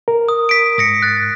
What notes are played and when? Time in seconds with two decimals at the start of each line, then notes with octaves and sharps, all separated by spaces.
0.08 A#4
0.29 D#6
0.49 B6 D7
0.78 G#2 D#6 A#6 C#7
1.02 F#6 A6